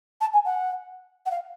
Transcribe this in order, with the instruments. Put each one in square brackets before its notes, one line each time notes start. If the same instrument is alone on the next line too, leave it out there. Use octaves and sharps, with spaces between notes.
[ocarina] A5
G#5
F#5
F#5
F5